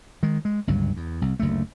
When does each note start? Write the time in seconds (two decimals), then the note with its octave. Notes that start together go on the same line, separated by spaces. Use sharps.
0.23 D#3 G#3
0.45 G#3
0.67 G1 C#2 G2 F#3
0.97 E2
1.22 C2
1.40 F#1 D2 A3